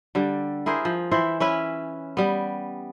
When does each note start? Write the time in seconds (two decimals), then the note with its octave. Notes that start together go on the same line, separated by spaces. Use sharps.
0.15 D3 G3
0.66 E4 G#4 A#4 C5
0.85 F3
1.11 E3 E4 C5
1.40 C#4 E4 B4
2.17 G3 B3